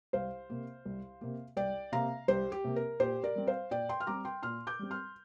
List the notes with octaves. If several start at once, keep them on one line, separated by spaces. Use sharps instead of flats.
C2 C5 F5
C3 A#3
C2
C3 A#3
C2 D5 G5
C3 A#3 F5 A#5
C2 G4 C5
G4
C3 A#3
A#4
A#2 G4 C5
A#4 D5
G3 C4
C5 F5
A#2 D5 G5
G5 C6
F6
G3 C4 A#5 D6
G5 C6
A#2 C6 F6
D6 G6
G3 C4
C6 F6